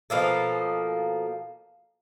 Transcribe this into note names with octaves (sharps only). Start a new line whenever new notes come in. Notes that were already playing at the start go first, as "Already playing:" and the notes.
B2 F3 A#3 A4